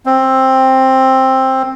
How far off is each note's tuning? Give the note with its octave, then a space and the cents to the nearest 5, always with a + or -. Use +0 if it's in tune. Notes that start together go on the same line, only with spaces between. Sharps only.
C4 +10